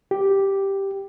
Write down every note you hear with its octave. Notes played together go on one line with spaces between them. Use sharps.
G4